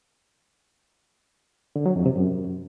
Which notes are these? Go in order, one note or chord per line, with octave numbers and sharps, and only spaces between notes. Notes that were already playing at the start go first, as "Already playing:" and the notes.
D3
F#3
F2
C3
F#2